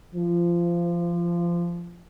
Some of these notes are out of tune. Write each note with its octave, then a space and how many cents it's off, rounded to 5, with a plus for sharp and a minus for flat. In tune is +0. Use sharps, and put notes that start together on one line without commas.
F3 -20